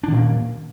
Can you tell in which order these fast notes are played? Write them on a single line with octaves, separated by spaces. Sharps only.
D4 D#3 A#2 A#3